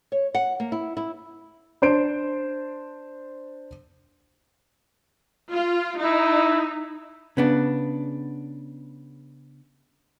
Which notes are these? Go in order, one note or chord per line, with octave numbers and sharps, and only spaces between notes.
C#5
F#5
A#3
E4
E4
D4 C5 D7
F4
D#4 E4
C#3 B3 D4